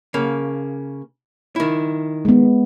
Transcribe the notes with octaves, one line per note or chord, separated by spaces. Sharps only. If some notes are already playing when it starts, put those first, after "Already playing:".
C#3 A#3
D#3 E4
G#3 B3